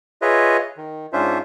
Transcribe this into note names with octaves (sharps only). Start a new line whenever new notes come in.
F4 G#4 B4 C#5 D#5 E5
D#3
G#2 C#4 D4 F4 C5 E5